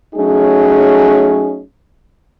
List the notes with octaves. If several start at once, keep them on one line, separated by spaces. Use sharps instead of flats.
F#3 A3 C#4 D#4 G#4